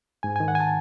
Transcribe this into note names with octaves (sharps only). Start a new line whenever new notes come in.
G#2 G#5
D#3 G#5
F#5
G#5
A5